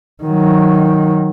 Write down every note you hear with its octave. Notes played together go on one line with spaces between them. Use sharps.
D#3 F#3